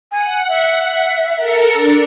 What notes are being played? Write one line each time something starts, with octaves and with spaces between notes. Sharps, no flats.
F#5 G#5
E5
A4 A#4 C#7
D4